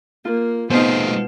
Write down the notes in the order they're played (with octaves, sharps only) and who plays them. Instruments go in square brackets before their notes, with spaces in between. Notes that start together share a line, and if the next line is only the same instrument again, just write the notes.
[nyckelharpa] A#3 [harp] F4
[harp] B2 [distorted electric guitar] A3 G#4 [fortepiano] C4 D#4 [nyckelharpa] F4 F5